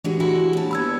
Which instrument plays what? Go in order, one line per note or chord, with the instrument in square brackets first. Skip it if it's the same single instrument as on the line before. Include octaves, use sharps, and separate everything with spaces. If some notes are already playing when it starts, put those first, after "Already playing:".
[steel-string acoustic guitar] A2 G#3 F#4 [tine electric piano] E3 D4 G4
[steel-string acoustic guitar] G#3 E4 F#4
D#2 A5
[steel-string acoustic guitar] D#2 G3 B3 [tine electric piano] B5 E6 G#6